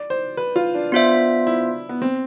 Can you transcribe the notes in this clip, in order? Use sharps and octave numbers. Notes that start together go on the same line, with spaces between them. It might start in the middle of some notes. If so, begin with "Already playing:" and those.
Already playing: D5
C5
B4
F4
D4
B3 D4 F4 C5 E5
E4
B3
C4